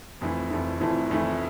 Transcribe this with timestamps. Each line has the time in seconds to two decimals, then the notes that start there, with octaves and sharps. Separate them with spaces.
0.21 F1 F2 E3 A3 E4
0.50 F1 F2 E3 A3 E4
0.80 F1 F2 E3 A3 E4
1.09 F1 F2 E3 A3 E4